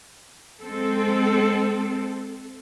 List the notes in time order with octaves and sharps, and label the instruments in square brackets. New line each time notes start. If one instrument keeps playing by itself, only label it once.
[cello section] G#3 C4 A4